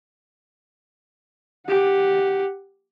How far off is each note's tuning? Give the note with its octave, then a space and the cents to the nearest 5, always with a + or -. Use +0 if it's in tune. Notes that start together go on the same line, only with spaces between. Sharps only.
G4 +0 F#5 +0